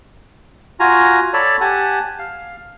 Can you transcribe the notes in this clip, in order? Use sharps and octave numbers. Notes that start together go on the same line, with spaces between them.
F4 F#4 G#5 A#5
A4 C#5 D5 A5 B5
G4 F#5 G#5 A5
F5